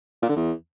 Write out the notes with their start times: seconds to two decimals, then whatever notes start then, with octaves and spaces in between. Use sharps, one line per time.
0.22 A#2
0.29 D3
0.36 E2